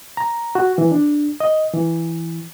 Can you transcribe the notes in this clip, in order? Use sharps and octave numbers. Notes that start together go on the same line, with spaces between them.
A#5
F#4
E3
D4
D#5
E3